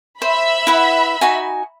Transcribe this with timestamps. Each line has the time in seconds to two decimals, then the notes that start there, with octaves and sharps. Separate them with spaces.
0.22 C5 E5 B5
0.67 E4 B4 F#5
1.21 D#4 F#4 G#5